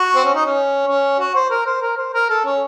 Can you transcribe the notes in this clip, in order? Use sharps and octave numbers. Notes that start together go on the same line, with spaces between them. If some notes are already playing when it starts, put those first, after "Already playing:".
Already playing: F#4
C4
C#4
D#4
C#4
C#4
F#4
C5
A#4
C5
A#4
C5
A#4
A4
C#4